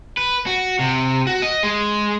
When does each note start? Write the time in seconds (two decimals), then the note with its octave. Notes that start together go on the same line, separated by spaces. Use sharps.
0.17 B4
0.47 F#4
0.79 C3
1.27 F#4
1.42 D#5
1.63 G#3